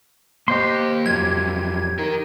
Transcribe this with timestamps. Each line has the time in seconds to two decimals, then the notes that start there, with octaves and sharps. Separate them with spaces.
0.48 A#3 G4 C5 D#5 C6
1.06 F2 F#3 G#6
1.99 D#4 A#4